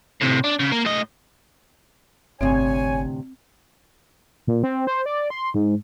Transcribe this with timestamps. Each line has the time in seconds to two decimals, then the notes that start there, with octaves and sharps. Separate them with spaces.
0.21 A2 C3
0.44 D4
0.59 C#3
0.72 A#3
0.85 A2 D#5
2.41 G1 D2 A2 C3 C4 C#5 G#5
4.47 A#2
4.64 C4
4.87 C5
5.06 D5
5.30 C6
5.54 G#2